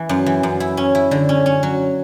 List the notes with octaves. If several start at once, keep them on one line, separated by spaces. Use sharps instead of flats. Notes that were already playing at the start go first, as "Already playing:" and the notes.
Already playing: E3
F#2
E3
F#2
E4
C#4
E4
D3
C#4
C#4
F#3